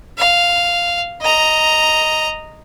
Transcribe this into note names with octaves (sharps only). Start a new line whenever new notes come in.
F5
D#5 A#5